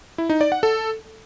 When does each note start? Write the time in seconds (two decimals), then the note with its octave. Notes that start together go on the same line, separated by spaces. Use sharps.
0.18 E4
0.30 D#4
0.41 D5
0.52 F#5
0.63 A4